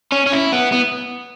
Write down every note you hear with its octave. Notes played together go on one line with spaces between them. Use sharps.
C#4
C#4
E4
B3
B3